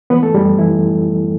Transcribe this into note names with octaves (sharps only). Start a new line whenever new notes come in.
E3 B3 B4
A3 A4
F#2 G3 G4
E3 G3 E4